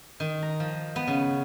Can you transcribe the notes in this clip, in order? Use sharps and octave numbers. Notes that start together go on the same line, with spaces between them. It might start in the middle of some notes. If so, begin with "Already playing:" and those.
D#3
A#5
F3
B3
C#3